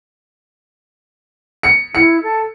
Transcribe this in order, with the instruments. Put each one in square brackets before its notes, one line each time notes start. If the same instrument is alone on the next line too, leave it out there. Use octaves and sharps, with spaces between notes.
[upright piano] C#7
[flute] E4 [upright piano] C#7
[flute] A4